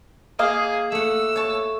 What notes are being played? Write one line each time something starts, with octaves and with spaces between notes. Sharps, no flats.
A#3 G#4 D#5 F5
A3 F#5 E6
C#5 A5